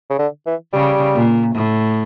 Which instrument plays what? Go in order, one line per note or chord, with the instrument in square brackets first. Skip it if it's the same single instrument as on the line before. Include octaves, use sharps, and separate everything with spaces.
[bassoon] C#3
D3
E3
[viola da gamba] C#3 [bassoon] G3
[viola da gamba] A#2
A2